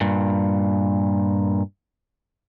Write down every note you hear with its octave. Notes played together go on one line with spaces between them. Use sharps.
G2 A#2